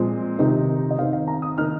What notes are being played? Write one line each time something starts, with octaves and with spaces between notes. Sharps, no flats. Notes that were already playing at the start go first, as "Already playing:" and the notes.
Already playing: A#2 F3 G#3 C4
C3 D#3 C4 D#4
D#5
D#3 C4 D#4 F5
F5
A#5
D#6
D#3 A#3 D#4 F6